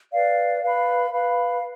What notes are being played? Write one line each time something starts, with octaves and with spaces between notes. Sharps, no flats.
B4 D5 F5
B4 F5 B5
B4 F5 B5